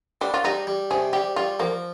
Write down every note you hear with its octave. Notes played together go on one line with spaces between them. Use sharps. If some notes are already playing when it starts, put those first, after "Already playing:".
G3 D4
F4
G3 D#4
G3
C3 G#4
G3 G4
G3 F4
F3 A#3